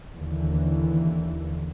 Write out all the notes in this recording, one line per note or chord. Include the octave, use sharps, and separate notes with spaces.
D#2 D3 E3